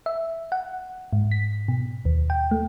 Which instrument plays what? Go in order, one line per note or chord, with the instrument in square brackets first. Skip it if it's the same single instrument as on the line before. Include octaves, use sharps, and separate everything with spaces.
[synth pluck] E5
F#5
G#2
B6
B2
D#2
G5
A3